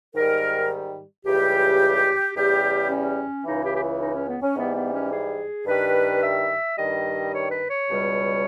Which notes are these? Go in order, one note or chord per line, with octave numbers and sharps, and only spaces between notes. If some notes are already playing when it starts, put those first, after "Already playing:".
G#2 D#3 G3 A#4
C#2 C#3 E3 G3 G4
E2 C#3 G3 G4
C#4
C#2 C#3 E3 D#4
G4
G4
E4
D#4
C#4
B3
C#4
G#2 E3 G3 B3
B3
C#4
G#4
G2 D#3 G3 B4
E5
G2 D#3 G3 D#5
C#5
B4
C#5
C#2 B2 G3